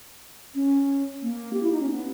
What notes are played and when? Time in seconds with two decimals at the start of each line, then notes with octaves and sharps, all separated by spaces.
0.55 C#4
1.22 A#3
1.53 G4
1.63 E4
1.71 D#4
1.81 C#4
1.90 B3